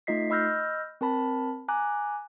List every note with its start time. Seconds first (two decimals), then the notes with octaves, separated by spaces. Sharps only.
0.07 A3 D#4 F4 D#5 B6 C7
0.30 D#5 B5 E6 F6 G6 A#6
1.01 C4 A#4 A5 B5
1.68 G#5 A#5 D6 F#6